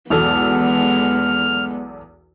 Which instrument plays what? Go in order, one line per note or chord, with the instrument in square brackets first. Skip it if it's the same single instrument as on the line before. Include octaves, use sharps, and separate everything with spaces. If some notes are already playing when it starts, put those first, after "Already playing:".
[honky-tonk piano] B1 E2 A4 [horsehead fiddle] G#3 B3 [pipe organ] F6